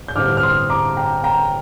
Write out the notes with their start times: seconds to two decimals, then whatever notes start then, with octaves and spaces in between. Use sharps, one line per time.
0.08 G6
0.15 A1 G2 D3 G3 C4 D6 F6
0.37 F6
0.43 C6 D#6
0.70 A#5 D6
0.97 G5 A#5
1.24 G5 A#5